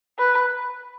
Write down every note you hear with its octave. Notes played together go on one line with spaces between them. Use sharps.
B4